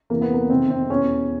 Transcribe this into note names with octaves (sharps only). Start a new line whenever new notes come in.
E2 C3 E3 A#3
B3
A#3
F2 C3 D#3 C4
C4
E2 B2 C#4